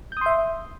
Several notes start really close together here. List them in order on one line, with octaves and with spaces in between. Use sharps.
G6 D#6 C6 E5